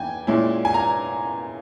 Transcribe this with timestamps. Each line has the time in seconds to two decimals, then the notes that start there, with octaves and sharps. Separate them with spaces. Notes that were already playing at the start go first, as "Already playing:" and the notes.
Already playing: E2 E3 G5 G#5
0.27 A#2 G#3 C#4 E4
0.65 G#5
0.74 A#5